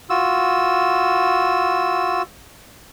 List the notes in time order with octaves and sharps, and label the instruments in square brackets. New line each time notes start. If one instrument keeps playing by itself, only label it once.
[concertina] F4 F#4 E6